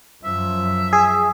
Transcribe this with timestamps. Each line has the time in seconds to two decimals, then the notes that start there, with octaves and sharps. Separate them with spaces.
0.25 F#2 F3 E5
0.93 G#4